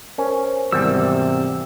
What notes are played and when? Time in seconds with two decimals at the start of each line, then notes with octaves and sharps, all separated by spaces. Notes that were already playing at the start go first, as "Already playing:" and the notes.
0.18 C#4 A#4 C5 G#5
0.72 G#1 E2 C3 G3 E6